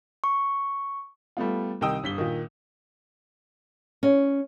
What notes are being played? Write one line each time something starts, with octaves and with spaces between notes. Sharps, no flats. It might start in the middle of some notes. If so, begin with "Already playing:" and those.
C#6
G3 A3 B3 F4
C2 D#3 D#4 G5 D#6 E6
G1 B6 G7
A#2 D#3
C#4